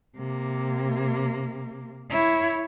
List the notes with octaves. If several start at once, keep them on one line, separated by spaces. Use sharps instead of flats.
C3 A#3
E4 C#5